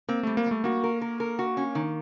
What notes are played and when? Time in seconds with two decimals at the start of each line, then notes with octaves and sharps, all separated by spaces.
0.09 A#3 C4
0.23 G3 A3
0.37 A#3
0.46 G3
0.51 A3
0.64 A#3 F#4
0.84 A#4
1.01 A#4
1.20 A#4
1.39 F#4
1.57 C#4
1.75 D#3